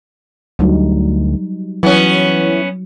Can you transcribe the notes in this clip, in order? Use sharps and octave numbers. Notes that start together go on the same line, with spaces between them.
D2 F#3 G3 D#4
E3 F#3 B3 C#4